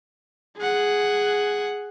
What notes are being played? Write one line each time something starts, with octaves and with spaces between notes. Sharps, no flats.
G#4 F#5